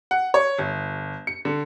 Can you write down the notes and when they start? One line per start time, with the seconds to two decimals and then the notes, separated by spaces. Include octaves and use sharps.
0.11 F#5
0.34 C#5
0.59 G1
1.27 C#7
1.45 D3